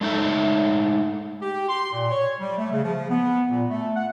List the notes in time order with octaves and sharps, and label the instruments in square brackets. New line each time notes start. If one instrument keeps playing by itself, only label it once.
[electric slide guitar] G#3 A3 D#4 A4 E5
[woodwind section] G4
C6
A#2
C#5
G3
A3
C#3
F3
B3
A#2
A3
F#5